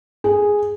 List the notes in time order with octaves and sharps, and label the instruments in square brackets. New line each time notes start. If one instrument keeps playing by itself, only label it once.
[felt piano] G#4